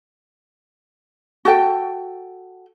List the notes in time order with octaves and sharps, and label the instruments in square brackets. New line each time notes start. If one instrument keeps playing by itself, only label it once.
[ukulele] F#4 A4 G5